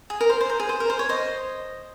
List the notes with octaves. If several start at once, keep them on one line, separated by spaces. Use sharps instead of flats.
G#4
A#4
C5
C5
A#4
G#4
C5
A#4
C5
C#5
C5 D#5